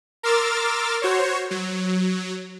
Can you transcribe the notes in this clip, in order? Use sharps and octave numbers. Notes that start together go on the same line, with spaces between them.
A#4 C6 D6 E6 F6 A6
F#4 C5 C#5
F#3